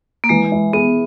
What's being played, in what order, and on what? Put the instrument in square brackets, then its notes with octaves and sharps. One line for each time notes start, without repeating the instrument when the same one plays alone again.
[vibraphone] A#3
[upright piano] E3 [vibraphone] G#3
[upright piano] E4
[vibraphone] B3 [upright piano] G#4